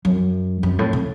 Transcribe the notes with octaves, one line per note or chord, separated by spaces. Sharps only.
F#2
F#2
A2
C#3